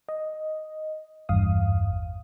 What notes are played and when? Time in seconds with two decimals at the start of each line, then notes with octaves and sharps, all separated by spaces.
0.09 D#5
1.29 G#1 E2 G2 F5 D#6